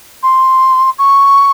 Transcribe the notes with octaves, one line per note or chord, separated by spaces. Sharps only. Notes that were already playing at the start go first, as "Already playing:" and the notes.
C6
C#6